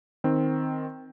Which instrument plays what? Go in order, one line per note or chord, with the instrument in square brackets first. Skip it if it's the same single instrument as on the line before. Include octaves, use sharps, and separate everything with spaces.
[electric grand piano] D#3 C4